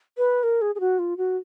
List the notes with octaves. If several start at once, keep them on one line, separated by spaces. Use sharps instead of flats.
B4
A#4
G#4
G#4
F#4
F4
F#4